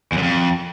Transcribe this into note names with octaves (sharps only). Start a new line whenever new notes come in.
E2
F#2
F2